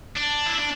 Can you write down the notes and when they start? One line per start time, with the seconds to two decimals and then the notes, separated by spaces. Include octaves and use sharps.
0.16 D4
0.46 E4
0.57 D4